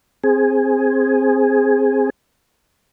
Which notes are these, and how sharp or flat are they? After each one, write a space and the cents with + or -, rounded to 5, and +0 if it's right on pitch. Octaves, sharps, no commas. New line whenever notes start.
C4 +5 G#4 +0